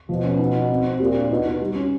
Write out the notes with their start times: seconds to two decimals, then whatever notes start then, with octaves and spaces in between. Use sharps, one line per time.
0.09 B2 F3
0.24 C#4
0.39 D#4
0.55 D#4
0.70 C4
0.85 C4
1.00 A#2 G4
1.15 D4
1.31 B2 D#4
1.45 D#4
1.61 G3
1.75 C#4